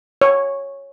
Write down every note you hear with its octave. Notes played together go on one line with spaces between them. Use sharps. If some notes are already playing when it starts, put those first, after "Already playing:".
C#5